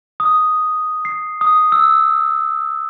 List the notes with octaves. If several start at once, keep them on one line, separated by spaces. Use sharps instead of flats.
D#6
C7
D#6
E6